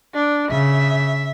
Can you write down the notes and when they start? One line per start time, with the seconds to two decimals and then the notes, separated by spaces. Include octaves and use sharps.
0.14 D4
0.51 C#3 E5